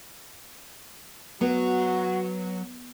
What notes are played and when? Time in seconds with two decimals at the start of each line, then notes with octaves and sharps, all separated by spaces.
1.41 F#3 B3 F#4